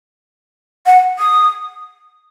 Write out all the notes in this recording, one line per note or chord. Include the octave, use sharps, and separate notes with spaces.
F#5
D#6